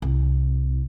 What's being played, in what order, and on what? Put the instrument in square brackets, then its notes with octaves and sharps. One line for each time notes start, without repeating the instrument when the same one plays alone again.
[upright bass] C2